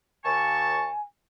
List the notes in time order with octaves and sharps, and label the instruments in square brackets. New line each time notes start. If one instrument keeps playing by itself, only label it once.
[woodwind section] D#2 A5 C#6 [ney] G#5